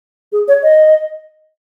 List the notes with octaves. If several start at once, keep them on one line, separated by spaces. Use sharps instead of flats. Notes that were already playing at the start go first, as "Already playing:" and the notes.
G#4
C#5
D#5